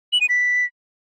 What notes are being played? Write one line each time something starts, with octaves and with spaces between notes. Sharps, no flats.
F#7
D#7
B6